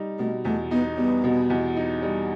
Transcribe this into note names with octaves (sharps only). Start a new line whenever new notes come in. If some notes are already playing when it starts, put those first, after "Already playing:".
Already playing: G3 D#4
B2 A3
E2 A3
B3 D#4
G3 B3
B2
E2
D#4
G3